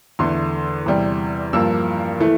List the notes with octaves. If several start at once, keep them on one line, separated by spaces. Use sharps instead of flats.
E2 D3 A3 C6
E2 C3 G3
G2 F3 A#3 E6
E3 A3